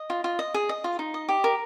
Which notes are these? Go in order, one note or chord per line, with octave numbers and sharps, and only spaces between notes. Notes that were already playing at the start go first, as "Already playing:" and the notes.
Already playing: D#5
F4
F4
D#5
G#4
D#5
F4
D#4
D#5
G4
A#4